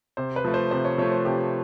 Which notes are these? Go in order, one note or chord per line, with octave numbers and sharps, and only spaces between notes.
C3 C5
B4
F3 A3
C5
C3 C5
C#5
F3 A3 C#5
C5
C3 G4